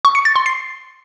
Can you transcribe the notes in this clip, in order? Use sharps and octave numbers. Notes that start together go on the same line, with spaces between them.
C#6
C#7
A6
C6
C7